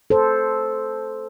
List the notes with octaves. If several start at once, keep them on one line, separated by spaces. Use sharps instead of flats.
A4 C5